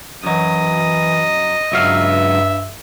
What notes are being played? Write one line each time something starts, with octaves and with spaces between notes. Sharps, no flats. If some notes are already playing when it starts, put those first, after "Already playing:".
F#2 E3 F#3 D#5
C#2 G2 F#3 E5 F5